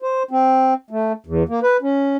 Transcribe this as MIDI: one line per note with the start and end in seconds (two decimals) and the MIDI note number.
0.02 0.23 72
0.31 0.74 60
0.90 1.12 57
1.26 1.43 40
1.49 1.60 58
1.63 1.77 71
1.82 2.17 61